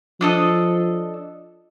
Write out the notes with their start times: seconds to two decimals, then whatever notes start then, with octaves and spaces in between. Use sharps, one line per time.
0.21 F3 D4 A4 D#5